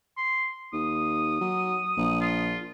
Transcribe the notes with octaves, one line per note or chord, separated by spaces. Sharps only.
C6
D#2 D#6
F#3
A#1
F4